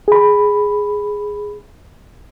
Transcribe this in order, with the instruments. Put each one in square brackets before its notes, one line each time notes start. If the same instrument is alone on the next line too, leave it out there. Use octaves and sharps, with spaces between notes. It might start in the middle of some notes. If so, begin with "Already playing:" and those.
[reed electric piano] G#4 B5